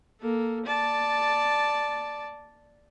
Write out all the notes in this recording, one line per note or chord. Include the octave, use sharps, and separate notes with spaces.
A#3 A4
D5 A5